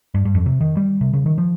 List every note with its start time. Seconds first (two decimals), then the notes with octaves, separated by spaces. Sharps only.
0.14 G2
0.25 G2
0.35 F2
0.46 C3
0.61 D#3
0.77 G3
1.01 C3
1.13 C#3
1.26 D#3
1.38 F3